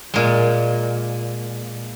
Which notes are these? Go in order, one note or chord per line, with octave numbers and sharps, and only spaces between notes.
A#2 G#3